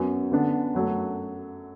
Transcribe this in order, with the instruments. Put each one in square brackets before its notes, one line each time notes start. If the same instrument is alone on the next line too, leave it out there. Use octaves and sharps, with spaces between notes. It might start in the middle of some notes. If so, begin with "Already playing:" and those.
Already playing: [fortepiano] F#2 F#3 B3
D3 B3 D4
F#2 F#3 A3